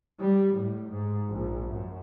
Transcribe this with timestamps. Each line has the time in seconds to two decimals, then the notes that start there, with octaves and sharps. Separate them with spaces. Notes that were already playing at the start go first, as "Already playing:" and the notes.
0.20 G3
0.57 A2
0.90 G#2
1.30 A#1
1.72 F#2